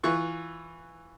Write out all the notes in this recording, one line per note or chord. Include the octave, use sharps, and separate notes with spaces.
E3 F4 C#6 F#6